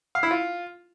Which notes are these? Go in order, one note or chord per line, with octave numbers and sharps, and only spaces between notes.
F5
E4
F4